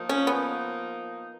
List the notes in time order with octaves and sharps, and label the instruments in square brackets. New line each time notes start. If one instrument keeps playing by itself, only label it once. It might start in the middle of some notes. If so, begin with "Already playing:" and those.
Already playing: [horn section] F3 A#3 D#4
[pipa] C#4
B3